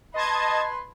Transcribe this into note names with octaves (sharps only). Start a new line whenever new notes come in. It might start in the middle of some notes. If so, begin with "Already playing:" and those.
B4 D#5 A5 C6 G#6